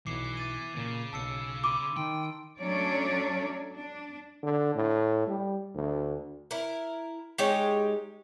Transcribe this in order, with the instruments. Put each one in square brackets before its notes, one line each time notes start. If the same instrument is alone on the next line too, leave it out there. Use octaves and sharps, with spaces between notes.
[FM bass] B1 [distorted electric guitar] E3 [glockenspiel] D6 C7 C#7
[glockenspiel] D6 A6 D#7
[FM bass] A#2 [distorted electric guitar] C#3
[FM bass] B1 [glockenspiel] A5 E6 C#7
[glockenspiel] B5 C6 D#7 [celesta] D6
[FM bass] D#3 [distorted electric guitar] G5 [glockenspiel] C6
[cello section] F#3 A3 C#4 D4 C#5 D5
D4
[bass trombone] D3
A2
G3
D2
[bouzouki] E4 A#4
G#3 D#4 G4 C#5